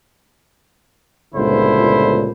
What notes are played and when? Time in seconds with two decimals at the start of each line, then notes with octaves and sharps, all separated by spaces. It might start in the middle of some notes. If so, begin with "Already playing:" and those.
1.35 G1 C#2 A#2 D3 E4 C5